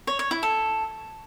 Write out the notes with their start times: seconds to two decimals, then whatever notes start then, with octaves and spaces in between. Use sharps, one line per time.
0.07 C#5
0.19 C#5
0.31 E4
0.43 A4